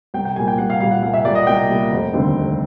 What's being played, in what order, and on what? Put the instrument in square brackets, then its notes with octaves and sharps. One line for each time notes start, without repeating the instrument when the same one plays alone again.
[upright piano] C2 G5
G5
A#2 G3 A#3 G#5
G5
C2 F#5
F5
A#2 G3 A#3 F5
F#5
C2 F5
E5
A#2 G3 A#3 D5
D#5
C2 G5
A#2 G3 A#3
F1
D#2 D3 G3 C4
F1